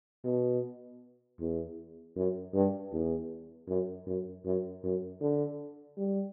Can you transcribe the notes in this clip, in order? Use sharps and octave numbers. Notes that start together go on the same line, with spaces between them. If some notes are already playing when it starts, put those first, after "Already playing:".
B2
E2
F#2
G2
E2
F#2
F#2
F#2
F#2
D3
G3